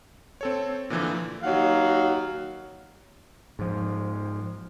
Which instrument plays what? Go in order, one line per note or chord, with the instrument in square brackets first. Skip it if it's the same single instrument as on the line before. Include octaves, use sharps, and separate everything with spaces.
[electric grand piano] C4 A4 C#5
A#2 D3 E3 F3
[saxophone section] D#2 F#3 F5 F#5
[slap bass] G#2 F3